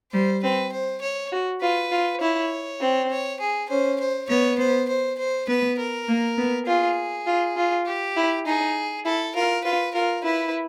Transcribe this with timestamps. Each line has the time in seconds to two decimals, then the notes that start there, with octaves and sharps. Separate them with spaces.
0.12 G3 C5
0.43 C4 B4
0.73 C5
1.02 C#5
1.32 F#4
1.62 F4 B4
1.91 F4
2.21 E4 C#5
2.81 C4
3.10 C#5
3.40 G#4
3.69 C#4 C5
3.99 C5
4.29 B3 C#5
4.59 C5
4.89 C5
5.19 C5
5.48 B3 B4
5.79 A#4
6.08 A#3
6.38 B3
6.67 F4 G#4
7.27 F4
7.57 F4
7.85 G4
8.16 E4
8.46 D#4 G#4
9.05 E4 A4
9.35 F4 A#4
9.64 F4 B4
9.94 F4 A#4
10.24 E4 B4